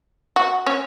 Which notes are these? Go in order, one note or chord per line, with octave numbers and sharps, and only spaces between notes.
F#4
C#4